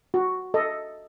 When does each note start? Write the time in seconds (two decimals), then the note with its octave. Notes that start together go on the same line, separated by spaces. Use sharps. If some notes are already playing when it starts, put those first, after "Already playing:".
0.14 F#4
0.54 A4 D#5